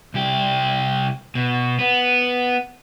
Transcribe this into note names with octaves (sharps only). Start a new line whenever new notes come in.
C2 G4
B2
B3